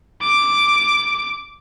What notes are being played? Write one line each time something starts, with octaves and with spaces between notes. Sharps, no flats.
D6